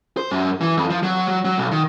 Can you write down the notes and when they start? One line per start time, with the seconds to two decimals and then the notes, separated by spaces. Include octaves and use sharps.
0.17 C5
0.31 F#2
0.61 E3
0.77 F2
0.90 F3
1.03 F#3
1.28 F#3
1.45 F#3
1.58 B1
1.71 D#3